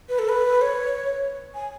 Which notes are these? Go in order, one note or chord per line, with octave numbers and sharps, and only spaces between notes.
B4
A4
B4
C#5
G#5